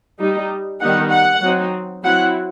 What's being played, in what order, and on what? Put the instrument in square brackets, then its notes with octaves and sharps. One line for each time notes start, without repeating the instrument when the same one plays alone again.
[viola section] G3 D#4
D#3 G3 B3 D#4 F#5
F#5
F#3 C4 D#4
F#3 C4 E4 F#5